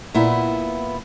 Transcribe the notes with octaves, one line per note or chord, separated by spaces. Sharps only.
A#2 B3 E4